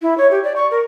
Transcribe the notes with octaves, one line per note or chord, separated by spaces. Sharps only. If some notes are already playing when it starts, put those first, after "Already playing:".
E4
C#5
G4
D5
C#6
A#4